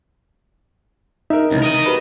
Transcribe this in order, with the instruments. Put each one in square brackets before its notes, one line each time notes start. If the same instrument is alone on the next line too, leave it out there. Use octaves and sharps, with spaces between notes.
[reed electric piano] D#4 [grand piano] A#4 E5
[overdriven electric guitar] C#2 [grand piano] C3 E3
[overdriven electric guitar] A#4 D#5 [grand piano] D#6
[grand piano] F#4 G4 B4